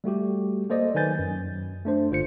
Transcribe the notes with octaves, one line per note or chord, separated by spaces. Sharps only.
G3 A3 F#4 G4
A#3 A4 C5 D5 D#5
D#3 F#3 B4 G#5 G6 A6
F#2
A3 D4 C5
G1 F4 C5 C#7